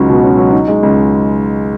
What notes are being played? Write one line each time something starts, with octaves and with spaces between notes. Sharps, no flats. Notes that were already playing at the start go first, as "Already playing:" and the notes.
Already playing: C#2 F#3 C#4 D#4
B2
C#4
F#3
D#4
G#3
C#2